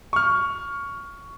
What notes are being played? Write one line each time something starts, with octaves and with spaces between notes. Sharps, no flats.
C#6 F6